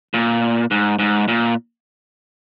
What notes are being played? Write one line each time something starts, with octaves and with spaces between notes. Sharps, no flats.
A#2
G#2
G#2
A#2